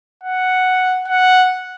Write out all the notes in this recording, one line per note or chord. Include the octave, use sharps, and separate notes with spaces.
F#5
F#5